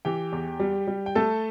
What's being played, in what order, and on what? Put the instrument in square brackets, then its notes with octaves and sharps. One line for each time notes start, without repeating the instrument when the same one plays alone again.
[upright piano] E3 G4 G5
E2
G3
G3
G5
A3 A4 A5